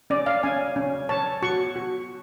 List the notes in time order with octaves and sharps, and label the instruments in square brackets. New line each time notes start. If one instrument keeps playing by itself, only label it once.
[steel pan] C#4 D5
F5
C#4 G#5
C#4
C#5 A5
F#4 C#6
F#4